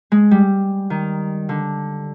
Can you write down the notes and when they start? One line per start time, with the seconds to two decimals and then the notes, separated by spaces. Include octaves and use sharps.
0.12 G#3
0.31 G3
0.90 D#3
1.49 D3